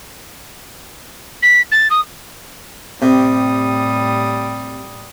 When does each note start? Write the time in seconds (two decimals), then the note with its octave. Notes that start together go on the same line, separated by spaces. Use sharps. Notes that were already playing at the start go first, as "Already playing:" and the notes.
1.42 B6
1.71 A6
1.90 D#6
3.02 A2 C3 G3 D#6